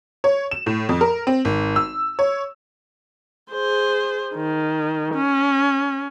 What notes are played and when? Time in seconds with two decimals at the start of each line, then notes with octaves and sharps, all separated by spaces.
0.24 C#5
0.51 E7
0.66 A2
0.89 F2
1.01 A#4
1.27 C4
1.45 G#1
1.76 E6
2.19 C#5
3.52 G#4 C5
4.35 D#3
5.15 C#4